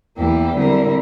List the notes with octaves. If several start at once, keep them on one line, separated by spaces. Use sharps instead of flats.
E2 E3 A#3 E4 G4
D3 G3 C4 E4 A#4